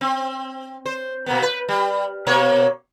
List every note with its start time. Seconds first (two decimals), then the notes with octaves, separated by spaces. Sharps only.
0.01 C4
0.86 C5
1.26 B2 A#3 B3
1.42 B4
1.69 G3
2.27 B2 A#3 C#5